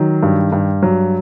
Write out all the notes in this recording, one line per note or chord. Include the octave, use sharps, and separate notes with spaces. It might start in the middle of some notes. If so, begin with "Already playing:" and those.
Already playing: D#3 F#3
G2
G2
F#3